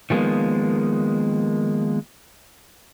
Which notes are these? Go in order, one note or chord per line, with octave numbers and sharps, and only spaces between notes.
D#3 F3 G#3 A#3 B3